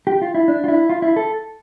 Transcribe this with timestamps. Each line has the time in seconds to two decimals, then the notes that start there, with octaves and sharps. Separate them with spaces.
0.07 G4
0.22 F4
0.34 E4
0.48 D4
0.64 F4
0.68 E4
0.89 F4
1.02 E4
1.16 A4